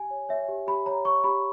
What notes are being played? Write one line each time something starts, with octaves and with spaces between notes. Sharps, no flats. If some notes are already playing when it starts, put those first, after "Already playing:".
Already playing: G4 G#5
C#5
C#5 E5
G4
G4 B5
C#5 A#5
C#5 C#6
G4 B5